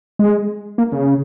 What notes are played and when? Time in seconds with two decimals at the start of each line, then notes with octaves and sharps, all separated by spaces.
0.19 G#3
0.78 A#3
0.92 C#3